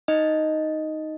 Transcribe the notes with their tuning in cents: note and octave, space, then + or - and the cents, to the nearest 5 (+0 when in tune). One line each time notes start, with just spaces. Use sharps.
D#4 +5 D#5 +0